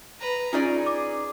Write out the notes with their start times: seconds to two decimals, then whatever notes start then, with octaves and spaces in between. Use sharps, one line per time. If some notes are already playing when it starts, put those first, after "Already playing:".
0.20 B4 A#5
0.53 C#4 D#4 F4 G#4 D5
0.86 D6